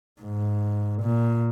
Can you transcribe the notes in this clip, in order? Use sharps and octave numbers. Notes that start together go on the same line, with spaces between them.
G#2
A#2